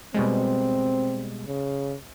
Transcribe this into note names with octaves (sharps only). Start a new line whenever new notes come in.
B2 G3 G#3 C4
C#3